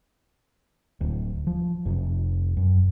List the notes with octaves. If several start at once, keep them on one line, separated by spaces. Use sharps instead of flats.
D1
F3
F1
F#2